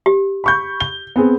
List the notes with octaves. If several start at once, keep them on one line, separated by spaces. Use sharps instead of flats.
G4
B5 C#6 G6
G7
B3 C4 G#4